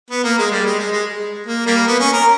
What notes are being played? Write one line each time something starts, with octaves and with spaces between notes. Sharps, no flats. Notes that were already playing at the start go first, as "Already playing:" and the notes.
B3
A#3
G#3
G3
G#3
G#3
G#3
A#3
G3 A#3
B3
C#4
A#4